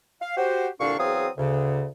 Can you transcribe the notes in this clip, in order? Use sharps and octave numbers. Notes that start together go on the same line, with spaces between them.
F5
F#4 G4 C5
C2 A#2 D3 D4 F5 C#6
E2 F#3 C4 G#4 F5 D#6
D2 C#3